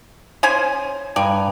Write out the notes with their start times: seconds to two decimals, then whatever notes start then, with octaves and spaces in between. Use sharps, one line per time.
0.43 C#4 C5 G#5
1.16 G2 D5 G#5 A#5